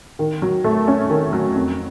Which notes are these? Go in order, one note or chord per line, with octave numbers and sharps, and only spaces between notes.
D#3
F#3
A3
C#4
D#3
F#3
F2